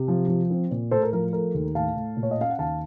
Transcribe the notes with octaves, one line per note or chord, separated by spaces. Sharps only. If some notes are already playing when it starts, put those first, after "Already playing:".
Already playing: C3
F3
F3
C4
A#2
A2 A4 C5
A#4
F3 A#4
A3 A#4
D#2
A2 F5 A5
A2
A#2
C#5
D#5
C#4 F5
F#5
D#2 F5 A5